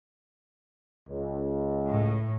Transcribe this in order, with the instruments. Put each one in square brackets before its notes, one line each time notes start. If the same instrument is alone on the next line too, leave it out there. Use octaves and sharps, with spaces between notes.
[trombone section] C#2
[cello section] A2